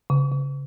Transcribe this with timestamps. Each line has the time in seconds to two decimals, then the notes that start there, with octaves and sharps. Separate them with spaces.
0.10 C#3
0.32 C#3